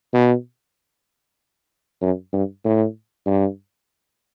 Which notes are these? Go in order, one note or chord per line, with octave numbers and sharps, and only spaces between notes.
B2
F#2
G2
A2
G2